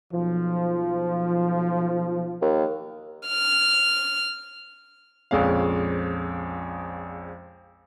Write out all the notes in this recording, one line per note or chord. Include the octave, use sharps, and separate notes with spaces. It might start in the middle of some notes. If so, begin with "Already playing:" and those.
B1 F3
D#2
F6
A#1 F2 G#3 C#4 F5